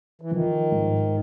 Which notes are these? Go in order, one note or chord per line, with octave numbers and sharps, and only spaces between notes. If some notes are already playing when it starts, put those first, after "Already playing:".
E3
D#3 F3
G#2